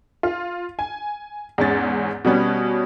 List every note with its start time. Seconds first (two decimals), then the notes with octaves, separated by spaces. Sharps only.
0.23 F4
0.79 G#5
1.58 E2 G#2 C#4 A6
2.25 B2 G3 B3 C#4